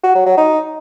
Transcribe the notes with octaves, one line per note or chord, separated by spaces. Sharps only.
F#4
F#3
F#3
D#4